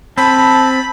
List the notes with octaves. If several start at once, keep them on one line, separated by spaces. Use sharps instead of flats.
C4 A5 B5